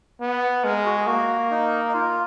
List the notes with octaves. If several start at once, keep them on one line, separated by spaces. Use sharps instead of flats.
B3
G#3 A#4
G#4
F#4
G#4
A#3 F#4
D#4
D#4
F4